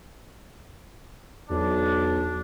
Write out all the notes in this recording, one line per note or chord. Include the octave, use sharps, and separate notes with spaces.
B1 E2 D4